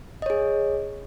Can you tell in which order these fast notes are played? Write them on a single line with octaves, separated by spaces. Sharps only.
D#5 C#5 G#4